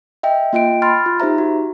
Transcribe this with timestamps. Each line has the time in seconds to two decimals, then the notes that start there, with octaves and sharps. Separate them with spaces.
0.23 D#5 E5 G5
0.53 A#3 F4 D#5 G5 D7
0.82 B5 C6 F6 A6
1.06 F4
1.20 D#4 G4 C5 E5 A#5
1.38 F#4